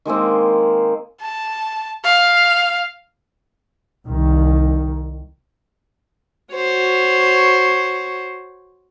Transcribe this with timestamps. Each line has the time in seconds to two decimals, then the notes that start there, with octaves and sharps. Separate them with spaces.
0.05 D#3 G#3 A#3 C4
1.21 A5
2.05 F5
4.07 C2 D#3
6.53 F#4 C5 C#5